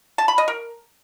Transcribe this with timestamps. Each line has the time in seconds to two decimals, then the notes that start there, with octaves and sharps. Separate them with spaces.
0.18 A5
0.28 B5
0.38 D#5
0.48 A#4